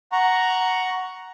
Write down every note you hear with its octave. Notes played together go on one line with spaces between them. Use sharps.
F#5 A#5 C#6